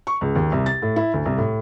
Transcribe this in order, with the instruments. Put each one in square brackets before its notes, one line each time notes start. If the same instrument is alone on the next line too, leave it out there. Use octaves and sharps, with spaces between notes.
[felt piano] C#6
C#2
D#2
C2
A6
A2
E4
D2
C2
A2